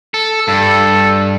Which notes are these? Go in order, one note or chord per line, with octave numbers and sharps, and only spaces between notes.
A4
G2 A4